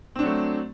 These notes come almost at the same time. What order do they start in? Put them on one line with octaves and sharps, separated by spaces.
C4 D4 F#3 A3